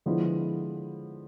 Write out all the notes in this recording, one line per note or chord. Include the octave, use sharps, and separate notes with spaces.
D3 F3 G#3 B3 E4